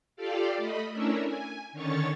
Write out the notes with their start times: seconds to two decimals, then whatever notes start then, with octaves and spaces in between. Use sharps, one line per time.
0.16 F4 G4 A4 D5 F5
0.57 A3 D#5 B5
0.91 A3 C#4 D4 E4 A#4 E5
1.24 G#5
1.72 D3 D#3 C#4 C#5 C#6 A6